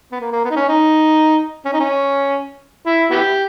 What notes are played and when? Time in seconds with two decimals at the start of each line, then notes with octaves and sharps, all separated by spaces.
0.12 B3
0.20 A#3
0.32 A#3
0.44 B3
0.50 D#4
0.56 C#4
0.68 D#4
1.65 C#4
1.73 D#4
1.80 C#4
2.86 E4
3.11 B3 E4 G4